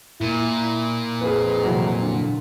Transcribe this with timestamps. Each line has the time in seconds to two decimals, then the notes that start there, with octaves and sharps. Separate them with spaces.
0.21 A#2 E4
1.21 F2 G#4 B4
1.63 C3 E3 F#3
2.02 D3